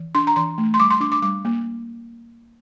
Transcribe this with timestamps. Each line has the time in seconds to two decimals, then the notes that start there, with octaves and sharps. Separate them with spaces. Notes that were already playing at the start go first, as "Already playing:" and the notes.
Already playing: E3
0.15 D4 C6
0.27 A#5
0.36 E3 C6
0.58 A3
0.74 C6
0.79 G3 D6
0.90 C6
1.00 D4 D6
1.12 D6
1.22 G3 D6
1.45 A#3